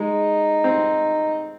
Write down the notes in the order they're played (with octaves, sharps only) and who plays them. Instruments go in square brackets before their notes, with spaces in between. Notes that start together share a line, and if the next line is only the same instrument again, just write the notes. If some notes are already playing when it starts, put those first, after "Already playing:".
Already playing: [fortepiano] G#3 [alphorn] D#4
[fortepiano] C4